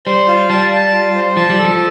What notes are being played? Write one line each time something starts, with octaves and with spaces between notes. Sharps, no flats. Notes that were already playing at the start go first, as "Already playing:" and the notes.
G3 C5
F4
G3 A5
A5
F4
C5
F3 A5
G3
A4
F3